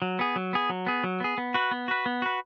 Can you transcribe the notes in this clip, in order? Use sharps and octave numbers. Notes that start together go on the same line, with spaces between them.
F#3
B3 G#4
F#3
B3 G#4
F#3
B3 G#4
F#3
B3 G#4
B3
F#4 B4
B3
F#4 B4
B3
F#4 B4